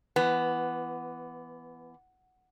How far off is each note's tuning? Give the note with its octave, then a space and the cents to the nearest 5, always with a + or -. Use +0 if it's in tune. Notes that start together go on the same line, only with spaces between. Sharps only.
E3 +20 B3 +0